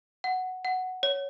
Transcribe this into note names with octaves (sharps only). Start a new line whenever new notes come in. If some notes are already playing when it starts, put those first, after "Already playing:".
F#5
F#5
C#5